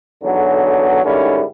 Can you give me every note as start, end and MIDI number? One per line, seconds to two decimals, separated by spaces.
0.23 1.01 35
0.23 1.01 40
0.23 1.01 50
0.23 1.01 54
1.05 1.43 44
1.05 1.43 50
1.05 1.43 51
1.05 1.43 55
1.05 1.43 61
1.05 1.43 64